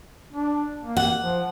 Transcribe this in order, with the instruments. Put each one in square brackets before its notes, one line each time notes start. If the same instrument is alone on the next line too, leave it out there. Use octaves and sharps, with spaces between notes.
[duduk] D4
A#3
[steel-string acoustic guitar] F#5
[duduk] F3